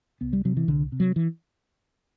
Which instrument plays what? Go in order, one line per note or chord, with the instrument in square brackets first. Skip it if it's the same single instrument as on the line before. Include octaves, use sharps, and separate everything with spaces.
[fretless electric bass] C2 B3
G3
C3 F#3
E3
C2 D3
C3
F#3
E3